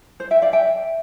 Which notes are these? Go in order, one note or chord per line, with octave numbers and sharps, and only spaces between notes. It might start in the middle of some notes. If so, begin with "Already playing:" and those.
C5
E5 G5
D5 F5
E5 G5